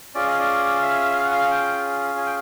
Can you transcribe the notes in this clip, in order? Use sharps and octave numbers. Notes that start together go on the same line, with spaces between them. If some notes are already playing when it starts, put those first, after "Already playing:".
C#4 F4 G#4 D5
D#5
D5
E5
F5
F#5
F5
G5
G#5
G5